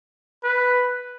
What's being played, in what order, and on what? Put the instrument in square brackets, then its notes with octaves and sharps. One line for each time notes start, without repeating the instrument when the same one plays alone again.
[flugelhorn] B4